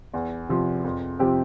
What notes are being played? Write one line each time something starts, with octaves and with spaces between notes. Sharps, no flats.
E2
C3 F3
F2
C3 F3 C4 G4